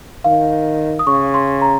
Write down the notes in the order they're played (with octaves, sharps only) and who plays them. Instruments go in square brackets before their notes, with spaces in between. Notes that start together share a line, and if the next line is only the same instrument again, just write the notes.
[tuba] D#3 [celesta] F5
[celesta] D#6
[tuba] C#3 [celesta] C#6
[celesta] C6
A#5